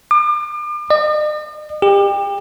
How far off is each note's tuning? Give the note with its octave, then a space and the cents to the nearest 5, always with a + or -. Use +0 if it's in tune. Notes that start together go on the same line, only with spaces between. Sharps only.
D6 +40
D#5 -45
G4 +30